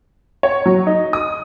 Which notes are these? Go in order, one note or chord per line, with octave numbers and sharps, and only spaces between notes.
C#5
F#3
D#4
D#6